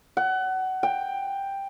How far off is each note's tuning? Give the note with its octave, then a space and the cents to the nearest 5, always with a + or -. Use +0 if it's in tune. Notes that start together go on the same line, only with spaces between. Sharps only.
F#5 +25
G5 +10